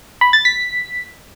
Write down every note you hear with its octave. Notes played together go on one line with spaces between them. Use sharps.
B5
A6
B6